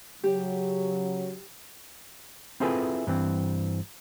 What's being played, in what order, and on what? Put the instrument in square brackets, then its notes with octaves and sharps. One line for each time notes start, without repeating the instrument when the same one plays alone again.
[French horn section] C#3 F#3 [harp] G4
[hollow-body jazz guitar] C4 E4 F4 G#4 A4 B4
G2 E3 C4